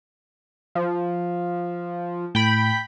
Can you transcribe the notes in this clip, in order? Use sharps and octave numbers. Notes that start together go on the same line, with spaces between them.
F3
A2 G5 B5